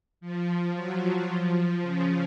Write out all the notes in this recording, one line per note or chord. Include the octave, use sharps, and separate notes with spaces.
F3
F#3
F3
C#3